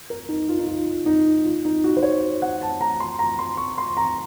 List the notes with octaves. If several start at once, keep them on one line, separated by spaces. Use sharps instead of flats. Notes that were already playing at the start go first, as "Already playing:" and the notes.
A#4
D#4
F4
D#4
F4
D#4
F4
D#4
F#4
C5
C#5
F#5
A5
A#5
C6
A#5
C6
C#6
C6
A#5